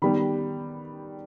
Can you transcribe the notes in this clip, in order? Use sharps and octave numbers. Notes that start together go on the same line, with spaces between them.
D#3 G3 B3 B5